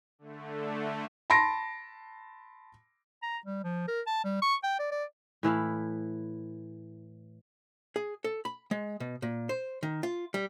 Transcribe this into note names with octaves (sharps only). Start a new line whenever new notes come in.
D3 A3
A5 B5 C6 A#6 D7
A#5
G3
F3
A#4
A5
G3
C#6
G5
D5
D5
A2 E3 E4 F5
G#4
A4
B5
G#3
B2
A#2
C5
D#3
F4
G3